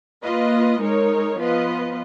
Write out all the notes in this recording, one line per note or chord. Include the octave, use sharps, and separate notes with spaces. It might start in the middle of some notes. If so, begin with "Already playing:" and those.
A#3 F4 B4 D#5
G#3 D#4 A#4 C#5
F3 B3 F4 B4 D#5